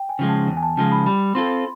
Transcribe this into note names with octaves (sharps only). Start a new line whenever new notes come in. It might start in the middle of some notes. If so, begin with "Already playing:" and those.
Already playing: G5
G#5
C#3 F3 G#3
A5
E2
G#5
A5
C#3 F3 G#3 A5
B5
G3 B5
C4 F4 A4 C6